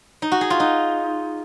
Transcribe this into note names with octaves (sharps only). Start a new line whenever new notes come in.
D#4
F#4
G#4
F4
D#4